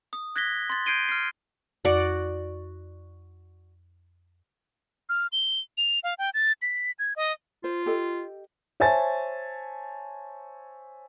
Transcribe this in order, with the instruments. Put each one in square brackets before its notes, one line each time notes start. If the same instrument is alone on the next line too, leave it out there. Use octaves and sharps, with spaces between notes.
[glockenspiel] D#6
F#6 G#6 A#6 B6 G7
C6 A6
G6 G#6 C7 D7 D#7 G7
F6 C7
[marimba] F2 [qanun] F#4 D5 F#5
[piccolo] F6
G7
F7
F5
G5
A6
B6
G#6
D#5
[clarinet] F4 [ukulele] C5
[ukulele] G4 A4 D#5
[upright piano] C5 C#5 E5 G#5 A5 A6